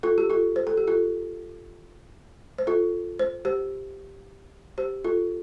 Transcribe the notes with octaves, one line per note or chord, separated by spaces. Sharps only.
F4 A4
G4
F4 A4
C5
A4
G4
F4 A4
C5
F4 A4
C5
G4 C5
G4 C5
F4 A4